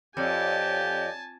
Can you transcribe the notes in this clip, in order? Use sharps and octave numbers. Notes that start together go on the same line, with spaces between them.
F2 G4 C#5 D5 G#5 A5